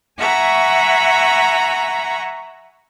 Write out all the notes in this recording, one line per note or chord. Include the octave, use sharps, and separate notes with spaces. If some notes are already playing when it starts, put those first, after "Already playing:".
E5 F#5 G#5 A#5 B5 C#6